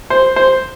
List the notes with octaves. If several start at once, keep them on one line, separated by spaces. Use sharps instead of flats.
C5
C5